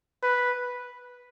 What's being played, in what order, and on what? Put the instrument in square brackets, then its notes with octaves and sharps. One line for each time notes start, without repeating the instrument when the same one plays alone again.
[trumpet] B4